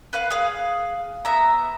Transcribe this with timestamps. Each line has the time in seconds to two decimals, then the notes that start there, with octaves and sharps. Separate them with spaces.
0.13 B4 F5 F#5
0.30 G#4 F5
1.25 B3 E5 A#5